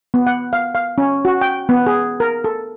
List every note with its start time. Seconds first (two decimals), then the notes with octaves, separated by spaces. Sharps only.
0.14 B3
0.27 F#5
0.53 F5
0.75 F5
0.98 C#4
1.25 F#4
1.41 G5
1.69 B3
1.87 G#4
2.20 A#4
2.44 A4